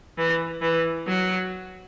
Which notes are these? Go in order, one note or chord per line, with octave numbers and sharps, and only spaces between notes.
E3
E3
F#3